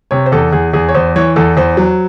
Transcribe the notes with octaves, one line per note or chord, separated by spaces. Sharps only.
C3 C#5
C5
E2 A4
E2 G#4
E2 G#4
C#5
E2 C5
E3 C#5
E2 A4
E2 C5
F#3